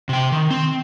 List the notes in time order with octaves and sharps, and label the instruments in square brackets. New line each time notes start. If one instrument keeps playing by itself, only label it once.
[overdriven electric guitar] C3 G5
D#3
C4